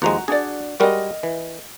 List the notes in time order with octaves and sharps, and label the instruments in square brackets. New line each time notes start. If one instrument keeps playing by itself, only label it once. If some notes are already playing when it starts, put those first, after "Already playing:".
[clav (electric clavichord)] D#2 F3 G#3 [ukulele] F#4 A#5
[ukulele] D4 F#4 D5 [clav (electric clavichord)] G#4
[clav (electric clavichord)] G3 G#3 F#4 [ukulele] A#4 D#5
[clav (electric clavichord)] E3